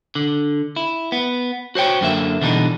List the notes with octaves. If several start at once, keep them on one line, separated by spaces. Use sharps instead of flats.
D3
E4
B3
F#4 C5 C#5 G5
F#2 D3 A#3 E5
B2 D3 E3 G3 D#4